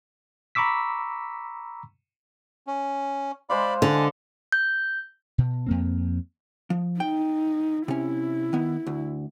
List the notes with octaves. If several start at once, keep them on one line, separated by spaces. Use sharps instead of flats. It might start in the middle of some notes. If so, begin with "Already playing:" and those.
A#5 B5 C#6 D6 E6 B6
C#4
G#3 C5 D5 F5 B5
D3 G#5 A5
G6
B2
F2 A#3 C4
F3
D#4 G5
C3 C#4 E4
D#3 B3
D2